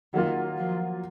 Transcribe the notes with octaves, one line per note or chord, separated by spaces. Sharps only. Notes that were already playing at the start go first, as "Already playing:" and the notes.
D#3 F#3 A#3 F4
F3